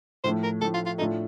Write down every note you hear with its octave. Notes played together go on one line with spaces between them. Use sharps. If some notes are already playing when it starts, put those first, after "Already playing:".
A2 F3 A3 C5
A#4
A2 F3 A3 A4
F4
F4
A2 A3 D4 D#4 F4 A4